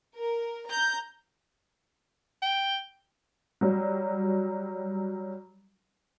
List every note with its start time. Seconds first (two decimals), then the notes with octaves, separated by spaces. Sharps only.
0.17 A#4
0.69 A#5 G6
2.42 G5
3.61 F#3 G3